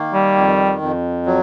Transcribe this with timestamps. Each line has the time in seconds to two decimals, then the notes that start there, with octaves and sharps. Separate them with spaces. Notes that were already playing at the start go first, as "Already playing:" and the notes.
Already playing: D#3 A#3
0.14 G3
0.37 F2
0.82 F2
1.26 F#3